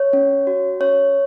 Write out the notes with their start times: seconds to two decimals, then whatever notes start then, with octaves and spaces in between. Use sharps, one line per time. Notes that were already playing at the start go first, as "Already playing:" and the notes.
Already playing: C#5
0.13 C#4
0.47 F#4
0.80 C#4 C#5